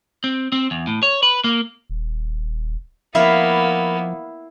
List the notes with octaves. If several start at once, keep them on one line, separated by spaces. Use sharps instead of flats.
C4
C4
E2
A2
C#5
B4
A#3
D#1
F3 A#3 B3 E4 E5 F5